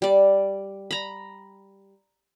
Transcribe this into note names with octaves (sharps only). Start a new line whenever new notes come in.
G3 D5
A#5 B5